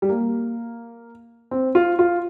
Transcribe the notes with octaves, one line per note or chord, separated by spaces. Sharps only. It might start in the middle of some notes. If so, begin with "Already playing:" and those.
G3
A#3
C4
F4
F4